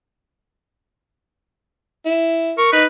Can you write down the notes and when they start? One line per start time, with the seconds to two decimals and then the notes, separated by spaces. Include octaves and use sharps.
2.06 E4
2.58 A#4 C#6
2.73 D#4 B4